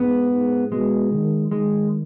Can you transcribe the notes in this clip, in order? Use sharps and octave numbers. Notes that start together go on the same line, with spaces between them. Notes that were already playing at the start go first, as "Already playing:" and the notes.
Already playing: G#2 B3
G#2
B2 G#3
D#3
D#3 G#3